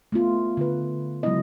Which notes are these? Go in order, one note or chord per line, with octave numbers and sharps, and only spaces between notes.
A3 B3 F4
D3 F4 B4
C#3 F#3 G#3 B3 E4 D#5